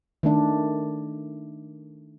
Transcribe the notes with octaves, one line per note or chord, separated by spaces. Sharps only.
D#3 A3 D4